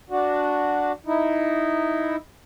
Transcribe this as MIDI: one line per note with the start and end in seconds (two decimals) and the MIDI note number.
0.10 0.92 62
0.10 0.92 66
1.06 2.16 63
1.06 2.16 64